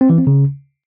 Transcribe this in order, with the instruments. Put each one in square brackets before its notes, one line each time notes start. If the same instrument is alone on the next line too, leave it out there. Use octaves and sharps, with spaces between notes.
[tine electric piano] C4
E3
C4
C#3